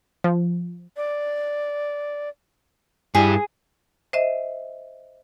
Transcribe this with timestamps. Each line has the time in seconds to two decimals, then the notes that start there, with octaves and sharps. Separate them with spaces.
0.24 F3
0.97 D5
3.15 G2 E4 G4 G#4
4.13 C5 D#5 E5